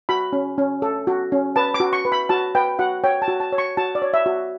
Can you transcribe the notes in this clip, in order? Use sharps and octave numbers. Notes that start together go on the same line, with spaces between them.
F#4 B5
C#4
C#4
A4
F#4
C#4
B4 A5
D6
F#4
C#6
B4
B5
F#4 A5
B4 G5
F#4 F#5
C#5 G5
A5
F#4
A5
C#5
C#6
F#4 A5
D5
C#5
E5
F#4